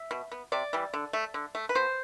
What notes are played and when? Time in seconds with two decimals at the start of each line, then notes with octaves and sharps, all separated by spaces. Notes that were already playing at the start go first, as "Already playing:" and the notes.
Already playing: E5
0.11 B2
0.32 B3
0.52 C3 D5
0.73 E3 G3
0.94 D3
1.13 A3
1.34 D3
1.55 A3
1.69 B4
1.75 B2 C5